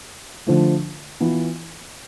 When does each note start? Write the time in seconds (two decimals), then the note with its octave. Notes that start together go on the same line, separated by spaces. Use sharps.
0.47 D3 F3 A3
1.20 E3 B3 F4